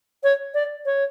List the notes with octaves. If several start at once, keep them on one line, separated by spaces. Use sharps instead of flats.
C#5
D5
C#5